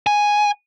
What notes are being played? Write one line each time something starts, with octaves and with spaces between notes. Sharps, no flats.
G#5